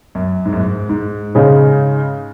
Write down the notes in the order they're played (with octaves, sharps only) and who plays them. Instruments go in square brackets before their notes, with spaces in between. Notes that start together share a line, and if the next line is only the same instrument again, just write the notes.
[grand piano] F#2
G#2
F#2
G#2
G#2
[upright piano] C#3 G#3 D#4